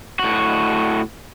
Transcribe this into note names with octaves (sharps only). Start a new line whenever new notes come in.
A2 F#4